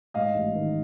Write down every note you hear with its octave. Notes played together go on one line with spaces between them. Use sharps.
G#2 D#5 F5
A1
D#3